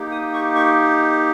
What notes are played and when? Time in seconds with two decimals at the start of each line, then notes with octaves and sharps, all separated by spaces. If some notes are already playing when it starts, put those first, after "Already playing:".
Already playing: A#3 D#4 G4
0.11 D#6
0.34 C#6
0.55 C#6